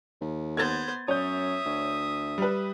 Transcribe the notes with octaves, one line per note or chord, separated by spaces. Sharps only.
D#2
B3 C5 G#6 A6
F#2 C#5 E5 D#6 G6
D2
G3 B4